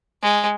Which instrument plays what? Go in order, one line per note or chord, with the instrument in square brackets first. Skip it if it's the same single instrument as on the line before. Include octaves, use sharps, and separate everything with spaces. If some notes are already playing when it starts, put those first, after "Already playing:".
[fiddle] G#3